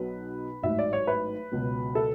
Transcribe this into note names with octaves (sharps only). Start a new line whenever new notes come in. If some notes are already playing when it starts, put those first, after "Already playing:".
Already playing: B1 B2 F#3 B4
A1 G#2 F#3 E5
D5
C#5
B4
C#2 B2 F#3
A4